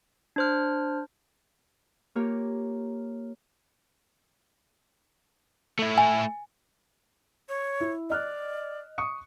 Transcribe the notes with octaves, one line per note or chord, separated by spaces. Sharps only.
D4 C5 F6
A#3 F4 G4 A#4 C#5
A3 E4
G#5
C#5
E4
D5 D#5 F6 F#6
C#6 D#6 C#7